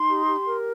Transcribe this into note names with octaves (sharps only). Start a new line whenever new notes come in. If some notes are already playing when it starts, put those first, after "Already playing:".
Already playing: D#4 C6
G4
G4
A#4